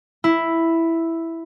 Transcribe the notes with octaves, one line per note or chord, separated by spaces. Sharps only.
E4